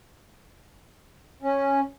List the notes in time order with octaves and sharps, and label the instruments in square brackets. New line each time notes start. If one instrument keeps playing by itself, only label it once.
[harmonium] C#4